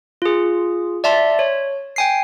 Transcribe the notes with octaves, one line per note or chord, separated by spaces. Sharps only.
F4 G#4
D5 E5 A5 C6
C#5
G5 G#5 C7